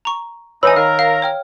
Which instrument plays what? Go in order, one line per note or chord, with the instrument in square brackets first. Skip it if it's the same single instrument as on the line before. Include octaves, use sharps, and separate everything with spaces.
[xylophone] A#5 C#6
[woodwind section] E3 D#4 [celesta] C#5 E6 [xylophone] G#5 B5
[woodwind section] D#3 A#4 [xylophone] F5
[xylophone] F5
C#5 G5 F6